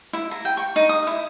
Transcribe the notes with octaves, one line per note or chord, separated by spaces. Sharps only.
E4
A#5
G5
C#6
D#4
D#6
E4